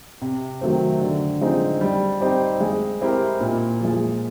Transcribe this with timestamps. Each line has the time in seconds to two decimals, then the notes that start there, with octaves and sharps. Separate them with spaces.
0.22 C3
0.61 D#3 F#3 A3 C4
1.01 D3
1.41 F3 G#3 C4 D#4
1.81 G3
2.21 C4 D#4 G4
2.61 G#3
3.01 C4 E4 G4 A#4
3.41 A#2
3.81 F3 G#3